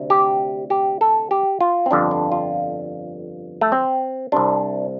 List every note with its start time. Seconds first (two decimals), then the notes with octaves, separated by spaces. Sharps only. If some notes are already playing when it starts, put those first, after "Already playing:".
Already playing: D2 C3
0.10 G4
0.70 G4
1.01 A4
1.31 G4
1.61 F4
1.86 C4
1.91 G1 F2 D3 D4
2.11 D4
2.32 F4
3.61 A3
3.72 C4
4.32 C2 C3 D4